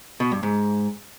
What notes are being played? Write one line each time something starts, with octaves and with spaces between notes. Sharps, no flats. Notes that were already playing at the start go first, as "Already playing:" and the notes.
B2
G2
G#2